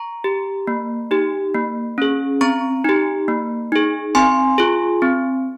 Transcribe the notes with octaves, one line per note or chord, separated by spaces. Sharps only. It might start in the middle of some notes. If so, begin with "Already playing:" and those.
Already playing: A#5 C#6
G4
A#3
D#4 G4
A#3
C#4 G#4
C4 A#5 C#6
D#4 G4
A#3
D#4 G#4
C4 G#5 C6
F4 G#4
C4